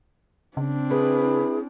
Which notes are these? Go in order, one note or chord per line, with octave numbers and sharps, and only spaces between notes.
C#3 C4 D4
E4 G#4 B4